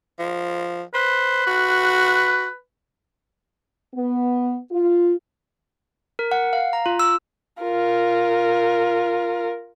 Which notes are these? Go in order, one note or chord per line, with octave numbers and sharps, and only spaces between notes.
F3
B4 C5
F#4
B3
F4
A#4
F#5
F5
A#5
F4
E6
F4 A#4